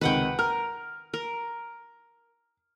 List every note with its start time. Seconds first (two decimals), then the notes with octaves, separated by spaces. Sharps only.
0.01 C#2 C3 D#3 B4 F#5 G5
0.39 A#4 F6
1.14 A#4